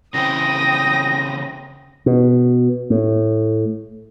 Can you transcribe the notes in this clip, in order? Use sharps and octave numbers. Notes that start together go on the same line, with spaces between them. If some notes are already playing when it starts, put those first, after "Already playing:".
C#3 E3 C4 G5 D#6 A#6
B2
A2